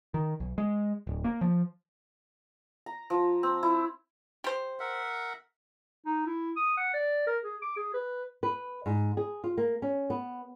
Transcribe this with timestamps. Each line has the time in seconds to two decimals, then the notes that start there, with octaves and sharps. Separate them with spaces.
0.14 D#3
0.40 B1
0.58 G#3
1.07 D1
1.24 A#3
1.41 F3
2.86 A#5
3.10 F3
3.43 C4
3.63 E4
4.44 G4 C5
4.80 A#4 E5 F#5
6.06 D#4
6.26 E4
6.56 D#6
6.77 F#5
6.94 D5
7.27 A#4
7.44 G#4
7.62 D6
7.77 G#4
7.94 B4
8.43 B4
8.86 G#2
9.17 G#4
9.44 F4
9.57 A#3
9.82 C#4
10.10 B3